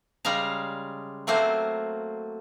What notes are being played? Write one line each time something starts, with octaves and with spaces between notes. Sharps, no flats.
C#3 G3 G#3 F5 A#5
F#3 A3 A#3 C4 C5